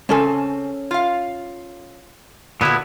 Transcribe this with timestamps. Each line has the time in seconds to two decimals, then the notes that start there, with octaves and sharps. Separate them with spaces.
0.09 C#3 C4 C#4 A4 G#5
0.91 F4 F5
2.61 A#2 D3 B3 E4 F#4